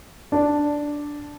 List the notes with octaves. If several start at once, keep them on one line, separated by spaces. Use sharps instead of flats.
D4 D5